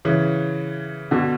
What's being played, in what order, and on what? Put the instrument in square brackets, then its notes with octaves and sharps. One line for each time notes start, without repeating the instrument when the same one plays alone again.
[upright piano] C#3 E3
B2 D3